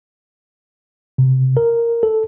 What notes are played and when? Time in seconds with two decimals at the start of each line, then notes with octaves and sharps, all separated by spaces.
1.18 C3
1.57 A#4
2.03 A4